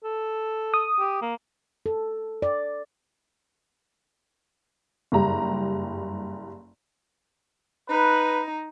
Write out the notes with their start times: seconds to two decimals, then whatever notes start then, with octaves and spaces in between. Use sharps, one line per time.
0.04 A4
0.74 D#6
0.99 G4
1.22 A#3
1.86 A4
2.42 D5
5.12 F#1 G2 G4 A#5
7.89 D#4 B4